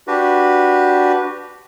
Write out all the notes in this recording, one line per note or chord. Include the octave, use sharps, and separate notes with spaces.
D4 F#4 G4 B4